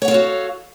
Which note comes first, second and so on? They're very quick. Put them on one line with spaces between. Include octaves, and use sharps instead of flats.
C#5 F#5 F5 A4 F#4